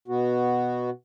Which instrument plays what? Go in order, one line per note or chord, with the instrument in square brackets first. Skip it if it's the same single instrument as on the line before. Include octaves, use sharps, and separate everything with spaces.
[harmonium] B2 B3 F#4